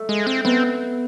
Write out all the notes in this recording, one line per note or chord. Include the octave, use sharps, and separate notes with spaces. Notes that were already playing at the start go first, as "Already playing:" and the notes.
Already playing: A3
G#3
C4
B3 C4